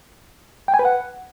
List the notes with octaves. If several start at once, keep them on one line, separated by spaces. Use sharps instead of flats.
G5
G#5
B4
F#5